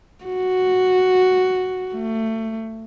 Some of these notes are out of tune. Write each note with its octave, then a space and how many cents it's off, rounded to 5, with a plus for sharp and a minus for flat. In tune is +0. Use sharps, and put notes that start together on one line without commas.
F#4 +0
A3 +25